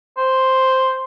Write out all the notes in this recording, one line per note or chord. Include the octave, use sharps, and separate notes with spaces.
C5